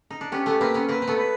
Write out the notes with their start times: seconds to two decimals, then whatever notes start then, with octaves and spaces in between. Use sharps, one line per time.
0.10 D#4
0.21 D4
0.32 B3 C#4 G4
0.46 A3 B3
0.60 A#3 C4 B4
0.74 B3 C#4
0.88 A#3 C4 B4
1.02 C4
1.07 A3 B3
1.17 B4